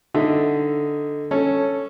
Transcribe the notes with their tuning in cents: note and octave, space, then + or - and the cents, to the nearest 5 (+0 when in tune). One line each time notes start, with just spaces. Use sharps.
D3 +0 D#4 +0 E5 +0
C#4 +0 A4 +0